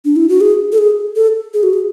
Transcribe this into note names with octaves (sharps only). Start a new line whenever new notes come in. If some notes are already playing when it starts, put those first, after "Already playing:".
D4
E4
F#4
G#4
A4
G#4
A4
G#4
F#4
G#4